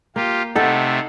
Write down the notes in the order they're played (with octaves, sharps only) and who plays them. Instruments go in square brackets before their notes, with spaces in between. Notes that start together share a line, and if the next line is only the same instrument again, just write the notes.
[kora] A#3 [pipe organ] F4 G4
[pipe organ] C3 A3 [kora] D#4 A4 [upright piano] F#5